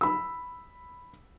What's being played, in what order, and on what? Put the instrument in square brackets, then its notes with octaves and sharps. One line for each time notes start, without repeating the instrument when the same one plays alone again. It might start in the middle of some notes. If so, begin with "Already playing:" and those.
[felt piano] B5 E6